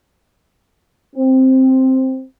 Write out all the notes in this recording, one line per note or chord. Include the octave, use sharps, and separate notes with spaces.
C4